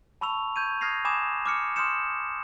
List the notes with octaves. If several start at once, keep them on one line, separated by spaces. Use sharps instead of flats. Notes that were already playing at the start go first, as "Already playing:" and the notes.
A5 B5 C#6 E6 F7
C#6 G6 G#6 D#7
D#6 F6 G#6 A#6 C7 F7
G#5 B5 D6 D#6 G#6 E7
D6 F6 C#7
C6 D#6 F6 G6 C#7 E7